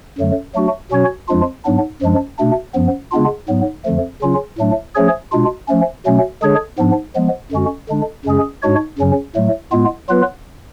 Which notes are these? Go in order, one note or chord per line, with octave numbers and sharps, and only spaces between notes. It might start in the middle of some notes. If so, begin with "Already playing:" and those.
F#2 D3 F#3 A3
F#3 A3 D4 F#4
B2 F#3 C#4 F#4 C#5
F2 F3 G#3 D4 F4
G#2 F#3 B3 D4
F#2 F3 G#3 D4
B2 A3 D4
F#2 F3 B3
C#3 G#3 B3 D4 F4
G#2 F#3 B3
F2 D3 F3 A3
C#3 F#3 C#4 F4
A2 F#3 A3 D4
F3 A3 C#4 G#4 C#5
B2 G#3 D4 F4
F3 A3 C#4
B2 F#3 A3 C#4
D3 G#3 D4 G#4 C#5
G#2 F3 B3 D4
F3 G#3 B3
F#2 D3 G#3 C#4 F#4
D3 G#3 D4
F#2 C#3 G#3 C#4 G#4
G#2 G#3 D4 F#4 C#5
F#2 C#3 F#3 C#4
A2 F#3 A3
A2 G#3 B3 F4
F#3 B3 F4 B4